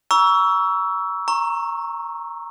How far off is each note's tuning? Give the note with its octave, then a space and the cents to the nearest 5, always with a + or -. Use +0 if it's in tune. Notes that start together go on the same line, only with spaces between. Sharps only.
A#5 +35 C#6 +30 E6 +0
A#5 +0 C#6 -20